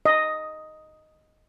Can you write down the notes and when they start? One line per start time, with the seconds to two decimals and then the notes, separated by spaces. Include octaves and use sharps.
0.06 D#5